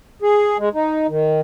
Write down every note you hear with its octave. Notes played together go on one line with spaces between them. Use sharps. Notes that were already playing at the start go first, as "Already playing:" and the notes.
G#4
G#3
D#4
D#3